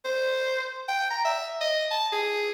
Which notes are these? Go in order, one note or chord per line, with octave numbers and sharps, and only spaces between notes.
C5
G5
A#5
E5
D#5
A5
G#4